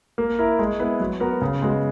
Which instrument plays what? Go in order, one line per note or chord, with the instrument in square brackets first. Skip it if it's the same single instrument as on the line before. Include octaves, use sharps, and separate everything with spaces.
[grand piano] A#3
E4 A#4
G#3
B3 E4 B4
F#3
B3 F#4 A#4
C#3
G#3 B3 F#4